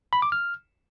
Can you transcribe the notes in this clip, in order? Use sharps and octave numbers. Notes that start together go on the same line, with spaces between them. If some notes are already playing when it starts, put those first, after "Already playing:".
B5
D6
F6